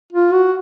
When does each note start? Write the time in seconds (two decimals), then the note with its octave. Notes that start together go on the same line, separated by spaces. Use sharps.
0.13 F4
0.33 F#4